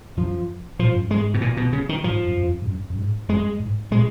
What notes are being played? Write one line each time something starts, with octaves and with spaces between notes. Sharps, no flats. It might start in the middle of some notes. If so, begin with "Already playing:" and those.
F#2 F3
A#2 F3
G#2
F#2
G#2
G#3
B2
A#2
B2
C#3
D#3
G#2 F3
F#2
F#2
F2
G#2
F#2
F#2
G#2
F#2 G#3
G#2
A#2 G#3